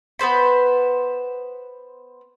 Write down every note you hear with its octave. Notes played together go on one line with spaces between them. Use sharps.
B3 B4 C5 B5